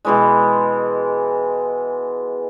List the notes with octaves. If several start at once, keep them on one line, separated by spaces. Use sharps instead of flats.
B2 E3 G#3